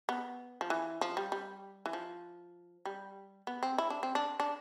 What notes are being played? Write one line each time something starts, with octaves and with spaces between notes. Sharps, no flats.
B3
F3
E3
F3
G3
G3
E3
F3
G3
B3
C4
E4
D4
C4
D4
D4